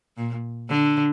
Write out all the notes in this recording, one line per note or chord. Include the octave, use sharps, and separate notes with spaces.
A#2
D3